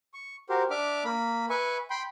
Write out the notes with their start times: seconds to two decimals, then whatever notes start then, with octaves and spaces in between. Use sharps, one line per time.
0.14 C#6
0.49 F#4 G4 A#4 C5
0.70 D4 E5 D6 F6
1.05 A#3 B5
1.50 B4 E5 G#5 C#6
1.90 G5 B5 C6